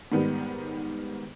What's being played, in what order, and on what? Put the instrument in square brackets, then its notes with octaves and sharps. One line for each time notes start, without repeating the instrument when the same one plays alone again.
[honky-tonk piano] G#2 D#3 G3 B3